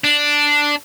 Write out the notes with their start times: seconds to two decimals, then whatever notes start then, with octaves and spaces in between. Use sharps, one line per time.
0.04 D4